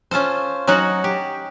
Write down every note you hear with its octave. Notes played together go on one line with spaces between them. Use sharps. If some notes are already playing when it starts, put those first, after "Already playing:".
C#4 F4 A4 C5
F#3 C#4 D#4 F#4
G4